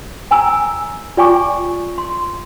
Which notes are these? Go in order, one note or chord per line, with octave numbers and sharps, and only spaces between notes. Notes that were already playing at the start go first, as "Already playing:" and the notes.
G5 G#5 A#5 E6
F4 D5 G5 G#5 C#6 D6
C6